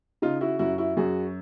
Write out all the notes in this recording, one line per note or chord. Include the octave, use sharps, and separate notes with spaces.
C#3 D#4 F4
E4 F#4
F#2 E4 F#4
E4 F#4
F#2 F#4 G#4